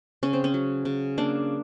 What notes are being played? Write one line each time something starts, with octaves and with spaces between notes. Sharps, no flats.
C#3 C#4
C4
C#4
F#3
C#3
A#3 D4